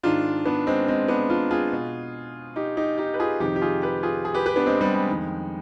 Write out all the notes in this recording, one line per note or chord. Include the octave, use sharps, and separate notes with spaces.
G#2 D#3 D4 F4
B3 D4
G#3 C4
G#3 C4
B3 D4
D4 F4
F4 G#4
B2
D#4 G4
D#4 G4
D#4 G4
B4
F4 G#4
F2 C3 D#3 D#4 G4
G4
F4 G#4
G4 B4
F4 G#4
G#4
G4 B4
G4 B4
B3 D4
G#3 C4
G3 B3
G#3
F2 D#3